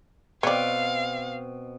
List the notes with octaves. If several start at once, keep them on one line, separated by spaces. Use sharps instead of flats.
B2 C4 C#5 D5 F5